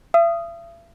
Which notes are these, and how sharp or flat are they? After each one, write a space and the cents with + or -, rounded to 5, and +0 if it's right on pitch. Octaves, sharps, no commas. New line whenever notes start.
E5 +45 D#6 +0